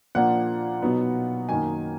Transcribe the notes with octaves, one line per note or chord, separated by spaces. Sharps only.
A#2 F3 A#3 D4 F#5
B2 F#3 B3 D#4
F#2 D#3 A#3 D#4 G#5